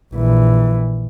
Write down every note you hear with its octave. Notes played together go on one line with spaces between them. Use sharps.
A#1 E3